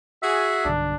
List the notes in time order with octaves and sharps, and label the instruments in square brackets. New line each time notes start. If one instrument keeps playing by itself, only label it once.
[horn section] F#4 G#4 [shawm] E5
[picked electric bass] B1 G2 D3 [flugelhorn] D4